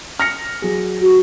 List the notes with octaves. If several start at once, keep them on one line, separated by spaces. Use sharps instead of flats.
F6 A#6 C#7
F#3 G#4
F#4